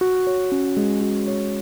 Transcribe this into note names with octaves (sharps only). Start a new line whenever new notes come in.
F#4
C#5
C#4
G#3
F#4
C#5